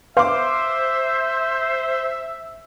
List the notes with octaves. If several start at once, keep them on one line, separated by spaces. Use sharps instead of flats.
B4 C5 E5 F5 C6 D6 F6